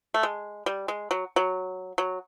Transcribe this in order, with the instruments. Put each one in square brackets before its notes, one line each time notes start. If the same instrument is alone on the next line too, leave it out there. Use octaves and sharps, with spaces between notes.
[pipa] A3
G#3
G3
G#3
F#3
F#3
F#3